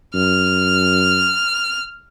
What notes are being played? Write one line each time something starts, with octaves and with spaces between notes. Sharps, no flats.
F#2 F6